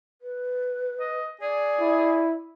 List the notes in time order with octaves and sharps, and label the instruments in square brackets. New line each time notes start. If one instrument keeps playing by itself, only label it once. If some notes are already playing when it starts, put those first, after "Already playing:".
[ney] B4
[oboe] D#5
[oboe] G#4 [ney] D5
[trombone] E4